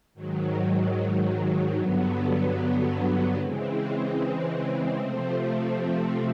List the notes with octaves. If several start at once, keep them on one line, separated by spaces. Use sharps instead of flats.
G#2 D#3 F#3
G2 D3 F#3 B3
C#3 E3 G#3 C4
C3 F3 A3 C4